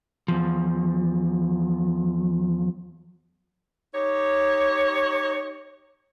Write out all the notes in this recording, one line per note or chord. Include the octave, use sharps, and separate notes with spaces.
E2 F3
D#4 G4 C#5